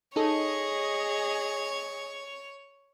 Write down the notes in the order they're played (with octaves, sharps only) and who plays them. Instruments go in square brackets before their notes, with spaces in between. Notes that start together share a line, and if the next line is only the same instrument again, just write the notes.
[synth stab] D#4 A4 [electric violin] G#4 D#5 [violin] C#5